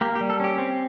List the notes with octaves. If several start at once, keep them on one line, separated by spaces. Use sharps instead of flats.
A#3 G4
G4
G3
A4
C#4 G4
C4